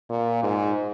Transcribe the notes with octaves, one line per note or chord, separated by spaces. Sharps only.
A#2
G#2